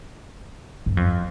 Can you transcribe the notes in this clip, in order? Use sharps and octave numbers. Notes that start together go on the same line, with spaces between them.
G2
F2